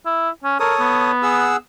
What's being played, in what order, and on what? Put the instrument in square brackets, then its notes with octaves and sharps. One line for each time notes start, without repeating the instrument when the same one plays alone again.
[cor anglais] E4
C#4
[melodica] A4 C#5 D#6 [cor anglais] A#4
[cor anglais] B3
[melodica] G#4 F#5 E6